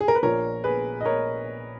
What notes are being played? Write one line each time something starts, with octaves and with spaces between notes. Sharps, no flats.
G#4
A#4
B4
A#1 A#2 F3 A#4 C#5
G#4 B4
D#5
A#4 C#5